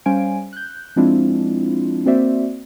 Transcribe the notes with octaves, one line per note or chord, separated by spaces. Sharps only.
G3 C#4 C5 F5 G#5 D7
F#6 G6
F3 G#3 C4 D4 E4 F4
A#3 C4 F#4 C5 D5 E5